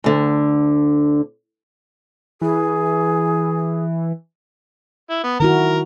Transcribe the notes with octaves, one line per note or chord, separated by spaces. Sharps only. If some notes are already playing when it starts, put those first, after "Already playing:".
D2 D3
E3 G#4
E4
B3
D#3 E4 F#4 A#4 A#5